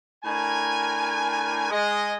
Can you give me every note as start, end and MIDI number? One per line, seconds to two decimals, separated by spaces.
0.24 1.68 45
0.24 1.68 62
0.24 1.68 70
0.24 1.68 80
1.71 2.15 56
1.71 2.15 75